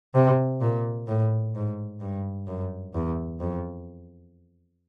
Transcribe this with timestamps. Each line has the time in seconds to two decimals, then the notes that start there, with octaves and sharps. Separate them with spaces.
0.15 C3
0.61 A#2
1.08 A2
1.55 G#2
2.01 G2
2.47 F#2
2.94 E2
3.40 F2